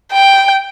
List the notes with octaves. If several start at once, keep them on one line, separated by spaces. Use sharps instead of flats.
G5